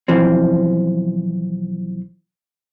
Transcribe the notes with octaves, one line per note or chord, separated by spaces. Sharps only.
B1 E3 F3 C4